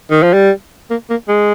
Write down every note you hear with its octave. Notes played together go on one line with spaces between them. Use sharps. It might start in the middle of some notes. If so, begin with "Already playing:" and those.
D#3
F3
G3
A#3
A#3
G#3